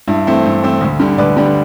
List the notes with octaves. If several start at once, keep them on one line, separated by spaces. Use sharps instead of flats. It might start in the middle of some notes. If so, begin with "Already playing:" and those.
G2 E4
E3 A3 C4
G2
E3 A3 C4
D2
D3 G3
D2 B4 D5
D3 G3